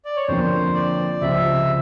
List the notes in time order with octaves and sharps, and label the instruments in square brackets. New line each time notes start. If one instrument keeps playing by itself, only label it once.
[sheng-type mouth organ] D5
C#5
[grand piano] F2 D3 F3 A#3 [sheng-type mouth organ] C5
[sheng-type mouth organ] D5
[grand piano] C#2 C3 F3 [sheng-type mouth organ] E5